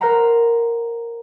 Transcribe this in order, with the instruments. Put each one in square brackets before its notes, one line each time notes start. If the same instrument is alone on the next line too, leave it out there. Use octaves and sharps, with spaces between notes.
[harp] A#4 C5 F#5 A#5 B5